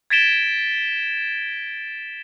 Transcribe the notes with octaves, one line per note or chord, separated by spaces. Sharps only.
G#6 A6 B6 D7 E7 G7